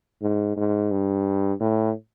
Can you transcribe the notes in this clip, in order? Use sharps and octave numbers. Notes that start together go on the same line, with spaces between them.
G#2
G#2
G2
A2